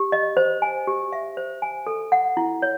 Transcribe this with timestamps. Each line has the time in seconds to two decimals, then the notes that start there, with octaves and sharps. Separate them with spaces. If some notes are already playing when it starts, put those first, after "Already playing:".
Already playing: G4
0.12 D#5
0.37 C5
0.62 G#5
0.87 G4
1.12 E5
1.37 C5
1.62 G#5
1.87 A4
2.12 F#5
2.37 E4
2.62 C#5